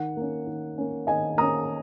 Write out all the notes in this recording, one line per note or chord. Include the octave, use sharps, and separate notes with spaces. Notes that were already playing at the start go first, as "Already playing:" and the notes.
Already playing: D#3 F#5
A#3 C#4
D#3
A#3 C#4
D#3 D#5 G#5
A#3 C#4 A#5 D#6